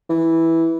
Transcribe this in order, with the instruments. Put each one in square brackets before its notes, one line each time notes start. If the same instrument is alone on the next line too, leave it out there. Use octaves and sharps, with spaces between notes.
[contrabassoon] E3